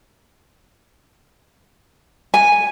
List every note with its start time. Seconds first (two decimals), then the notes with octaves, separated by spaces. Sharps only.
2.34 G#5